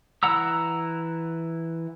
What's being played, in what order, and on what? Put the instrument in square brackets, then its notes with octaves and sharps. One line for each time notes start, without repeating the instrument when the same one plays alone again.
[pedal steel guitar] E3 E4 F#5 A#5 E6